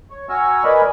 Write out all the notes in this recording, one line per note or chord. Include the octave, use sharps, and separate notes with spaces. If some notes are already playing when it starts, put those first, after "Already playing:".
C#5
F#4 G#5 A#5 C#6 E6 F6
A#4 B4 D5 D#5 G#5 B5